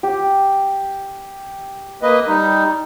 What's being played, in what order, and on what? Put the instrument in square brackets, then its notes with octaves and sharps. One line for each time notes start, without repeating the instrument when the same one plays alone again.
[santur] G4
[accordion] A#3 B4 D#5
G3 D#4